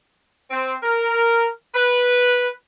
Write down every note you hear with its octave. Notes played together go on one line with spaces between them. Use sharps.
C4
A#4
B4